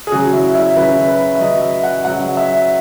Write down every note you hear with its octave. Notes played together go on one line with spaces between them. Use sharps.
G#4
C#3 F#3 F#4
E4
E4
C#3 F#3 B4
B4
E5
C#3 F#3 D#5
E5
F#5
C#3 F#3 F#5
E5